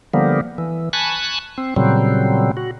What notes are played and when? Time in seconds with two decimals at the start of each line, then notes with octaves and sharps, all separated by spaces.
0.13 D3 F3 G3 A#3 B3
0.58 E3
0.93 G#5 A5 B5 C#6 F#6
1.58 C4
1.76 A#2 C#3 F#3 G3 C4
2.57 F#4